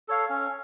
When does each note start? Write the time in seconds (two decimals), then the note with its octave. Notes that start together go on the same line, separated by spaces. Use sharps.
0.08 A4 C#5 F5
0.30 C#4